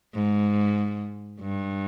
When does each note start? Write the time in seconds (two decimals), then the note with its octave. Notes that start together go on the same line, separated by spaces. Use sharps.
0.14 G#2
1.40 G2